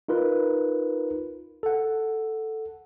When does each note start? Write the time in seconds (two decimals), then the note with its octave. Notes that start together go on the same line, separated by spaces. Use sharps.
0.08 D#4 F4 A#4 B4
1.63 A4 F#5